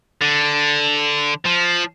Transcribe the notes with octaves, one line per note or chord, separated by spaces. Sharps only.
D3
F3